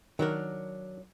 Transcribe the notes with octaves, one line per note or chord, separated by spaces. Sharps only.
D#3 F#3 D4 A#4